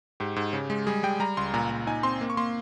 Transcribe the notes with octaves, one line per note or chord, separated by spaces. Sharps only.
G#2 G4
G#2
C#3
G#3
G3 G#4
G3 G5
G3 A#5
C#2 C6
A#2 A#5
A#2
D#4 G#5
C4 C6
A#3
C#6
A#3 C6